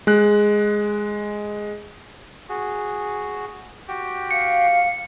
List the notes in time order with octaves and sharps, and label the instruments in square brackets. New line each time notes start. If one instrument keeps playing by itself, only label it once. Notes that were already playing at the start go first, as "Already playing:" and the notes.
[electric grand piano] G#3 F#6
[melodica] F#4 G#4
F#4 G4 G5
[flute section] F5 [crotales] C#7